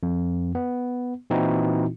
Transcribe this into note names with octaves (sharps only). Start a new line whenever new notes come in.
F2
B3
A#2 E3 C4 D#4 E4 F#4